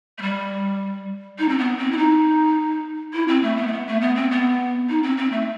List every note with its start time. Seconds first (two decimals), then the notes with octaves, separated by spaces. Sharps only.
0.18 A3
0.22 G3
1.39 D#4
1.49 C4
1.59 B3
1.78 C4
1.91 E4
1.97 D#4
3.13 E4
3.28 C4
3.43 A3
3.57 B3
3.67 A3
3.72 B3
3.87 A3
4.01 B3
4.16 C4
4.31 B3
4.89 D#4
5.03 C4
5.17 C4
5.32 A3